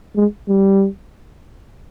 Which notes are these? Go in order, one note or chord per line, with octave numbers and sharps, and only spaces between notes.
G#3
G3